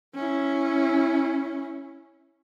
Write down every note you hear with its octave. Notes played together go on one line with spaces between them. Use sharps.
C#4 E4